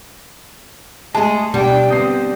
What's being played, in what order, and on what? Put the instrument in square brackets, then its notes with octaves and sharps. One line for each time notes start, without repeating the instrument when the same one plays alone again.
[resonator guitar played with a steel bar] G#3 G#4 [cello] A3 [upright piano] A5
[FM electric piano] B2 [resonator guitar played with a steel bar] G3 [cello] D4 G5
[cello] D3 C4 [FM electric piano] B3 G6 [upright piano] D#6 C7